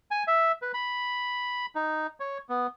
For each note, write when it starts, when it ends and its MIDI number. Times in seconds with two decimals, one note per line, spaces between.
0.11 0.23 80
0.28 0.52 76
0.62 0.72 71
0.74 1.66 83
1.75 2.07 63
2.20 2.38 73
2.49 2.67 59